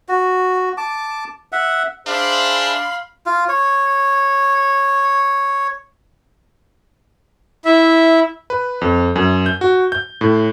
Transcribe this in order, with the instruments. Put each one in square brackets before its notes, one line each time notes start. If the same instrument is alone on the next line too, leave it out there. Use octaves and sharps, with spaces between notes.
[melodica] F#4
A5 D6
E5 F#5
[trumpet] D4 [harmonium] G#4 C5 E5 [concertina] F5 [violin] B5 C6
[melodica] F4
C#5
[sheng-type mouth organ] E4 E5
[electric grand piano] B4
F2
F#2
G6
F#4
G6
A2